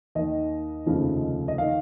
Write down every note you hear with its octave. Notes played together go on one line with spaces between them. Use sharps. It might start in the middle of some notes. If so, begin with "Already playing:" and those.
D#2 D#3 D#5
F1 D#2 C#3 F3
D#5
D#3 F5